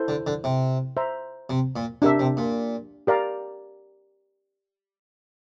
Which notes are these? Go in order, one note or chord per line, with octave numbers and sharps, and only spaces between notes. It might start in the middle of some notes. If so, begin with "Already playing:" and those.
Already playing: E4 A4 C5
D3
D3
C3
C5 E5 A#5
C3
A#2
C3 D4 G4 A#4 E5
C3
A#2
G4 A#4 D5 F5 A#5